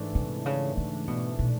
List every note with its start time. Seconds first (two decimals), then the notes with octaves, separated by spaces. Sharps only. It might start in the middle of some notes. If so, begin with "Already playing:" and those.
Already playing: G#2 E3 A3 D4
0.15 C3
0.46 C#3
0.77 C#3
1.08 B2
1.39 B2